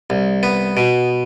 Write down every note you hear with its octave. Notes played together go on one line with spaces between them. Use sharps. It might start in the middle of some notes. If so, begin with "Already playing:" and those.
C2
B3
B2